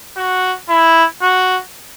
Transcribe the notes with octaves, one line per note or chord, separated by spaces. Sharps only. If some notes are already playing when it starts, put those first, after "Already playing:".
F#4
E4
F#4